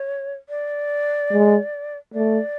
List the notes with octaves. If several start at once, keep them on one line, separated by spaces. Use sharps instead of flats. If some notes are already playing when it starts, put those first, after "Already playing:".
Already playing: C#5
D5
G#3
A3 D5